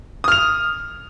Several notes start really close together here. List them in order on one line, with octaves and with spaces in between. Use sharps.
D#6 F6 F7